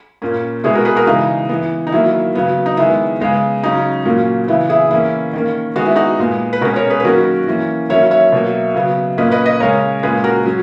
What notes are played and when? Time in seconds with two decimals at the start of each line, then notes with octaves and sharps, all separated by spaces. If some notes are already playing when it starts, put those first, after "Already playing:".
0.22 A#2 A#3 C#4
0.64 B2 G#3 B3 E4 G#4
0.74 F#4 A#4
0.85 G#4 B4
0.96 F#4 A#4
1.07 C#3 E3 G#3 D#4
1.49 E3 B3
1.87 D#4
1.92 D#3 F#3 A#3 E4
2.35 C#3 F#3 B3
2.66 D#4
2.77 D#3 G#3 B3 E4
3.20 C#3 G#3 B3
3.63 C#3 F#3 C#4 D#4
4.05 A#2 F#3 A#3 C#4
4.48 C#3 E3 B3 E4
4.69 E4 G#4
4.91 E3 A#3 C#4 E4
5.33 D#3 A#3 C#4
5.76 D#3 G#3 B3 F#4
5.86 E4
5.96 D#4 F#4
6.19 A#2 G#3 B3
6.53 B4
6.61 B2 G#3 C#4 F#4 A#4
6.76 A#4 C#5
6.90 G#4 B4
7.00 B4
7.04 D#3 F#3 A#3 C#4 F#4 A#4
7.48 E3 A#3 C#4
7.90 D#3 F#3 A#3 C#4 C#5 E5
8.11 C#5 E5
8.32 B2 F#3 A#3
8.75 C#3 F#3 B3
9.18 A#2 A#3 C#4 B4 D#5
9.32 B4 D#5
9.46 B4 D#5
9.60 C#3 G#3 C#4 A#4 C#5
10.03 A#2 G#3 C#4 G#4 B4
10.24 F#4 A#4
10.45 F#3 C#4